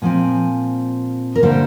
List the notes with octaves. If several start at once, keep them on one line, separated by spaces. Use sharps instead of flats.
A#2 F3 C4 G#5
A#4
D3 G3 A#3 C5